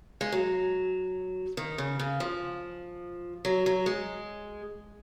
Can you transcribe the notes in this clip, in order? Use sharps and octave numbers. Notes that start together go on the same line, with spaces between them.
G#3
F#3
D#3
C#3
C#3
F3
F#3
F#3
G#3